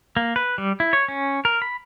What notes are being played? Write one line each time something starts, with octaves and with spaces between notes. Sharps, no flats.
A#3
B4
G3
E4
C#5
C#4
A#4
B5